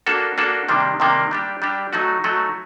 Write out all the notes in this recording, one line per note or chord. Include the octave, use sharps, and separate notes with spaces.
A#3 D4 F#4 A4
A#3 D4 F#4 A4
C3 D#3 G3 A#3 D4
C3 D#3 G3 A#3 D4
G3 D4 G4
G3 D4 G4
F#3 A3 D#4 F#4
F#3 A3 D#4 F#4